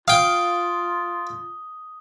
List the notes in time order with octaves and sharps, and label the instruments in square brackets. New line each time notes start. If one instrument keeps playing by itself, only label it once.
[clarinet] F4 [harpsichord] F5 G5 [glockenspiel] D#6 G7